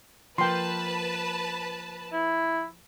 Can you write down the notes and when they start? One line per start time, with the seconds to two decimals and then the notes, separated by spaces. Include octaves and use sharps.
0.38 F3 A#3 B4 G5 A5 C6
2.13 E4